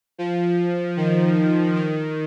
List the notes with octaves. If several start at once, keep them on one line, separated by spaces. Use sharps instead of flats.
F3
D#3
D#3